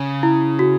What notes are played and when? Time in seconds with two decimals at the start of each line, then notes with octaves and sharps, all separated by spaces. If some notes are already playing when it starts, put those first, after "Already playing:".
Already playing: C#3
0.23 E4
0.59 F#4